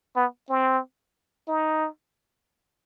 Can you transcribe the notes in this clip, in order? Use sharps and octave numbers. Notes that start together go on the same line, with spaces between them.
B3
C4
D#4